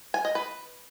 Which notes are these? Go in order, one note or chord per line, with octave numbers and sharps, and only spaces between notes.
G#5
D#5
B4